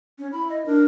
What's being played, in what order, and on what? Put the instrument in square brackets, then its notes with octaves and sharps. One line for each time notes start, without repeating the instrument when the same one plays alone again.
[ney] C#4
[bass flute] E4 [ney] B5
[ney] D#5
[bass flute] D4 [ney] A#4